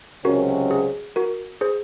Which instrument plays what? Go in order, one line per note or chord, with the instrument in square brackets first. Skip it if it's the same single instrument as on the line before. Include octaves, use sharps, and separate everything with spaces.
[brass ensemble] C#2 C3 F#3 C#4 [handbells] F#4 A#4
[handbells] G#4
F#4 A#4
G#4 C5